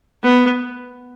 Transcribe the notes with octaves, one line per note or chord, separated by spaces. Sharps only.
B3